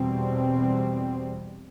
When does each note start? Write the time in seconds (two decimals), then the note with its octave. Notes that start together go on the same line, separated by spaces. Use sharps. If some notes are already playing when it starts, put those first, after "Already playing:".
Already playing: E2 B2 G3 C4